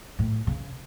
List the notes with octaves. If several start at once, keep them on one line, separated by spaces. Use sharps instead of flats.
A2
C#3